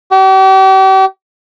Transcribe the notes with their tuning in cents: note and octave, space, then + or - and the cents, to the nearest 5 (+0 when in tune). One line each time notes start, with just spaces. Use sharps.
G4 -40